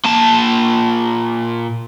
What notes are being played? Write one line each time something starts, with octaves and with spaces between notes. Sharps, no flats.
A#2 A5